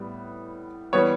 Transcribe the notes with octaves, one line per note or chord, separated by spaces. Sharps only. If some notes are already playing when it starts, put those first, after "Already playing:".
Already playing: A2 G3 B3
E3 G3 B3 C#5